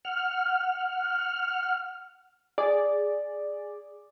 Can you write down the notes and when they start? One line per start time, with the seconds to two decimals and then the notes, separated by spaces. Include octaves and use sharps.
0.05 F#5 F6
2.58 G#4 D5